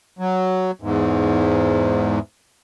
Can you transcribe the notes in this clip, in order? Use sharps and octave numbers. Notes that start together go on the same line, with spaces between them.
F#3
E2 G#2